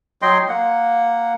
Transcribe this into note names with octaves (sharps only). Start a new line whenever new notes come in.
F#3 D#5 G5 C6
A#3 F#5